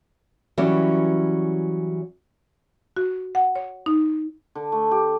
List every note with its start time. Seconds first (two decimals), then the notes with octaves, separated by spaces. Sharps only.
0.58 E3 F#3 G3 C#4
2.96 F#4
3.35 F#5
3.55 C#5
3.86 D#4
4.55 D3
4.72 A3
4.91 G4